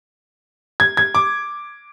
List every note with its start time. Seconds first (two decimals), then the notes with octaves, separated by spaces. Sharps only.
0.80 G#6
0.97 G#6
1.15 D6